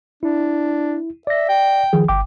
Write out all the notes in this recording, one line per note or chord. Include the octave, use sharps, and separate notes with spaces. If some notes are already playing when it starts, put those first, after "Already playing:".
D4 E4
D5 E5 A#6
G5
D#3 F3 G#4
G1 G5 D6